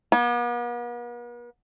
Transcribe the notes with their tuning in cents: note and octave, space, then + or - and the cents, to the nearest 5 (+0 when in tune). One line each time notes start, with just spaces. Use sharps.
B3 -45